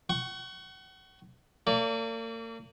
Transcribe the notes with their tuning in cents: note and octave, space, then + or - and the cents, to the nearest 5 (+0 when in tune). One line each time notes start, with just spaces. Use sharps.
F#5 +40 C#6 +0
A#3 -40 D5 -35